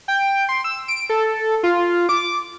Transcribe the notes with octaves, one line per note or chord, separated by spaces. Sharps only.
G5
C6
E6
D7
A4
F4
D6